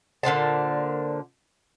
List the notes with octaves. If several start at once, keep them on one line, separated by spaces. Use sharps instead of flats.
A#2 D3 C5 A5